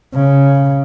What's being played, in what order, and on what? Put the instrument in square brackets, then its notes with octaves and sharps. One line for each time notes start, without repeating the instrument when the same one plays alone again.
[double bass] C#3